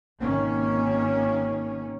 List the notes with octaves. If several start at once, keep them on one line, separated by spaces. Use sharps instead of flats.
G#1 B2 D#3 A#3 C#4